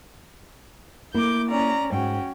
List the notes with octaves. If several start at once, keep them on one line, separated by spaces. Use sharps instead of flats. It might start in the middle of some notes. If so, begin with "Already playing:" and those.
A#3 E4 D6 G6
C#4 D5 A#5
G#2 C#4 F#4 G5